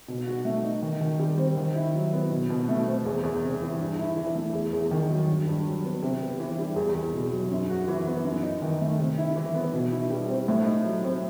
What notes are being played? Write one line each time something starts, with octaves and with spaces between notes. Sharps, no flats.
B2
F#4
A3
D#4
D#3
D#3
G3
C4
D#3
E4
F#3
B3
B2
B2
A3
C4
E2
E2
C3
E3
G2
E4
E3
A3
E2
E2
D#3
F#3
G2
G2
F#3
B3
C3
B3
E3
G3
E2
E2
B2
F#3
F#2
F#4
E3
B3
F#2
D#4
D#3
A3
C3
E4
E3
B3
B2
E4
G3
C4
A2
D#4
F#3
C4